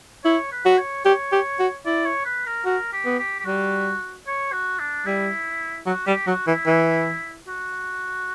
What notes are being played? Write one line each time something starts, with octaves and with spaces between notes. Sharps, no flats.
E4 C#5
B4
F#4
C#5
G4 C#5
G4
F#4
E4 D5
C#5
B4
A#4
F#4 A#4
G4
B3
G4
G4
G3 F#4
C#5
F#4
D4
G3 E4
F#3 F#4
G3 G4
F#3 F#4
E3 E4
E3
F#4